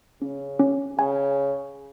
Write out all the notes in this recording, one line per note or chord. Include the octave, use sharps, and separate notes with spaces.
C#3 C#4
C#4
C#3 G#5